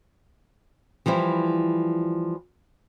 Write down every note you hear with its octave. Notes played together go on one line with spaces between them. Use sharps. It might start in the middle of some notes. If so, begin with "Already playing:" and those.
E3 F3 G3 E4